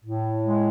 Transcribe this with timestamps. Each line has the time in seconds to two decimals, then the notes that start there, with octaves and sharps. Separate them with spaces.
0.04 A2
0.45 G#3